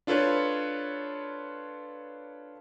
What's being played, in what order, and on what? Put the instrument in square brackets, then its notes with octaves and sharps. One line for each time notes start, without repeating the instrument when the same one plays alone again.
[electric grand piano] D4 F4 A4 B4 C#5